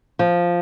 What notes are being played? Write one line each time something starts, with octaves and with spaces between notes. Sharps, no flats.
F3